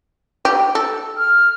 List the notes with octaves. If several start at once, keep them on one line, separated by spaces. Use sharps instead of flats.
G4
A4
F6